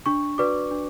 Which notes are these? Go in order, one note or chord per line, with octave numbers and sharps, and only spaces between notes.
D4 C#6
F#4 B4 D5 D6
D4